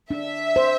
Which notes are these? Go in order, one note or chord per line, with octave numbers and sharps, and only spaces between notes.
D4 E5
C5